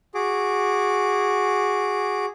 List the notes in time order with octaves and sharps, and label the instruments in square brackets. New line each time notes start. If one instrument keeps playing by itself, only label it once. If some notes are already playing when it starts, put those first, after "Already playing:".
[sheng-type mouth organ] F#4 G#4 D6